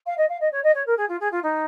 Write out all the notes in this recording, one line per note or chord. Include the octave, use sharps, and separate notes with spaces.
F5
D#5
F5
D#5
C#5
D#5
C#5
A#4
G#4
F4
G#4
F4
D#4